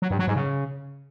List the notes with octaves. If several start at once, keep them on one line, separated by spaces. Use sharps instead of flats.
F#3
G2
F#3
G#2
C#3